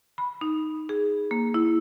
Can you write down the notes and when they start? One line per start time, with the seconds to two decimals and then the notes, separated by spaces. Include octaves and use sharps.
0.18 B5
0.41 D#4
0.89 G#4
1.31 A#3
1.54 E4